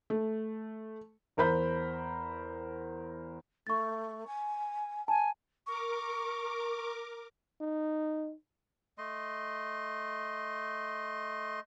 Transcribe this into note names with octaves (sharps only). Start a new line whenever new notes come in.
A3
E2 A#4 C5 B5 G6
A3 C#6 A6
G#5
G#5 A5
A#4 C#6 D6
D#4
A3 D#5 C6